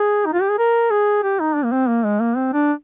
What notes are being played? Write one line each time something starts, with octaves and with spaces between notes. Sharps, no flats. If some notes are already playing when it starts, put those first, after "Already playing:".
Already playing: G#4
D#4
F4
G4
G#4
A#4
G#4
G4
D#4
D4
A#3
C4
A#3
G#3
A#3
C4
D4